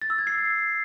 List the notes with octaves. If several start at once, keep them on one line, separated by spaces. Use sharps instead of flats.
A6
E6
G#6
C7